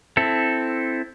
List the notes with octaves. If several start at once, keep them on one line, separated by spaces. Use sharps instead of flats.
C4 E4 A4